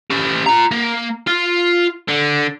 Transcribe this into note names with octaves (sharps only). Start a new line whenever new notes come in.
C#4 G4
F4 A#5
A#3
F4
D3